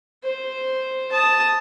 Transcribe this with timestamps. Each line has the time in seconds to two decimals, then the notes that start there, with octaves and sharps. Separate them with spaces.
0.23 C5
1.12 A5 D#6